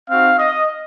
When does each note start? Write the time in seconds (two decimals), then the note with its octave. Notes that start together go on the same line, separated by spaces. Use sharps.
0.10 C4 D#4 F#4 F5
0.39 D#5